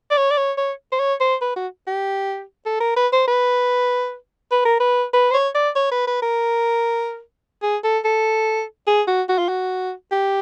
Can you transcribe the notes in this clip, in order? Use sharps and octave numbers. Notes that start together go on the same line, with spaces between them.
D5
C#5
D5
C#5
C#5
C5
C#5
C5
B4
F#4
G4
A4
A#4
B4
C5
B4
B4
A#4
B4
B4
C5
C#5
D5
C#5
B4
B4
A#4
G#4
A4
A4
G#4
F#4
F#4
F4
F#4
G4